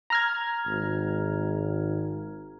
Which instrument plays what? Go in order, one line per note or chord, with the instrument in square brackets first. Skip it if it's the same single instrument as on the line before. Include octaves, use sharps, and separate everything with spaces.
[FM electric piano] A#5 F6 G#6
[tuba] G#1